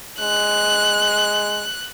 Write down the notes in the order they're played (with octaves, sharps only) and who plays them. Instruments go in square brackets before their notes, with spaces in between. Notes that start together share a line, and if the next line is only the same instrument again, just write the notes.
[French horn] G#3 [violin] F#6